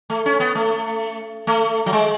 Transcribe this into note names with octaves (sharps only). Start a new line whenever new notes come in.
A3
C#4
B3
A3
A3
F#3
G#3